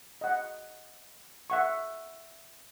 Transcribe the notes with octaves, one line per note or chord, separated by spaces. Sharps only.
D#5 F#5
E5 F#5 C#6